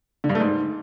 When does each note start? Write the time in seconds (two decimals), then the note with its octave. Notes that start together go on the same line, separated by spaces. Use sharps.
0.24 D3
0.29 G2
0.35 A3
0.40 G#2